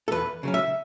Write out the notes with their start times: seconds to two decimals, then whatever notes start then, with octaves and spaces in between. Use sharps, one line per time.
0.08 A4
0.11 E2 B4
0.43 C#3 F#3 C#4
0.54 E5